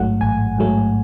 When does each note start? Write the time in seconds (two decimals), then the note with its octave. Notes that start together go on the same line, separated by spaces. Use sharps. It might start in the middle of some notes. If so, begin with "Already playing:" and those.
Already playing: A1 G#2 F#3 A3 F#5
0.21 A1 G#5
0.58 G#2 F#3 A3